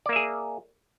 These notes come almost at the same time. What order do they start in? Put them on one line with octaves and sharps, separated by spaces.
D5 A#3 E5 G#4